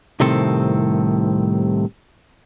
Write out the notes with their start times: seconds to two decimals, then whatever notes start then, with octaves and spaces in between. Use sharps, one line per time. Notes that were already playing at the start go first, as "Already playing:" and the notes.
0.20 C2 A2 C3 D#3 C4 A4